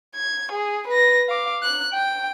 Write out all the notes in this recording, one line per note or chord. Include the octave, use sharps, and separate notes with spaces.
G#6
G#4
B4 A#6
F5 D6
F#6
G5